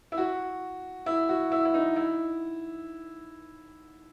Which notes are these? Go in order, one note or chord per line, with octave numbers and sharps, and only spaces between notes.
E4
F#4
E4
F#4
E4
E4
D#4
E4